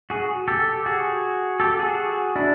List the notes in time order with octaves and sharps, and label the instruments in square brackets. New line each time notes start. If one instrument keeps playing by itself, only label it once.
[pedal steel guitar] F#4 G#4
G4 A4
F#4 G#4
G4 A4
F#4 G#4
D4 E4